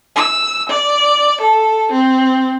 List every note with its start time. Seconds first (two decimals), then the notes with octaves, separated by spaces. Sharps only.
0.15 E6
0.69 D5
1.41 A4
1.92 C4